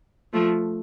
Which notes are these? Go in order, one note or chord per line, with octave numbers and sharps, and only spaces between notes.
F3 A3